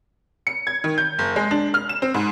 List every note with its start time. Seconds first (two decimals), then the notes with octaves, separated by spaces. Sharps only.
0.47 C#7
0.67 G#6
0.84 D#3
0.98 G6
1.19 F#1
1.36 G#3
1.51 D4
1.74 F6
1.89 E7
2.02 C4
2.14 G#2